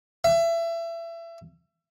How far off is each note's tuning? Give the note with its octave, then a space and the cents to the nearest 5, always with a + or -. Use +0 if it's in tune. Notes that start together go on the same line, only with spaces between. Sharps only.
E5 +25